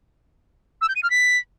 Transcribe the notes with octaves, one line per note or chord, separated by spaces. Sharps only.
E6
G6
D#7
F6
B6